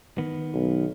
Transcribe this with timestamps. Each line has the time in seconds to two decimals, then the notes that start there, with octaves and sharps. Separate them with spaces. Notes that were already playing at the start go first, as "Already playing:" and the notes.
0.18 D#3 B3
0.54 B1